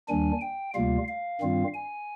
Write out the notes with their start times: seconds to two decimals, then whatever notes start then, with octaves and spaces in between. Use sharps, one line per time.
0.08 D#2 D#3 G3 D4 G#5
0.41 G5
0.74 D2 C3 G3 A#3 F4 F5
1.08 F5
1.41 G2 D#3 G3 C4 F4
1.74 G#5